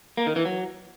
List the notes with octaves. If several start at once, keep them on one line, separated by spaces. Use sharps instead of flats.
A#3
D#3
E3
F#3